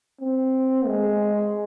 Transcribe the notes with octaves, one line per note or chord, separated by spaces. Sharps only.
C4
G#3